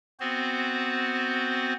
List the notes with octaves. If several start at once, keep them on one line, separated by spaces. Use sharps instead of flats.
B3 C4 F#4 C5